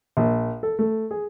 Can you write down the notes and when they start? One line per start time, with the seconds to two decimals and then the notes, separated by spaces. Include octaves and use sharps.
0.17 A#1
0.63 A4
0.79 A3
1.11 G#4